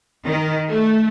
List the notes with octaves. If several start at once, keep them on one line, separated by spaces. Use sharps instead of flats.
D#3
A3